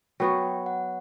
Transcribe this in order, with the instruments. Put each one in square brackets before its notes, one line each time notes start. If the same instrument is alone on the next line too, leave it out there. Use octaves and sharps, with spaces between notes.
[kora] F#3 B3 F#4 [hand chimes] G5
[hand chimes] F#5